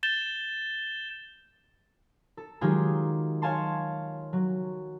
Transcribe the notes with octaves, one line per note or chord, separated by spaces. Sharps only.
G6 A6 E7 G7
A4
D#3 F#3 G#3 F4 G4 G#4
C#5 F5 G#5 A5 C6
F#3